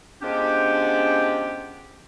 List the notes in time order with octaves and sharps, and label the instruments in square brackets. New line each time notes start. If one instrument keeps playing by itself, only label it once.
[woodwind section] F3 G#3 B3 C#4 D4 G4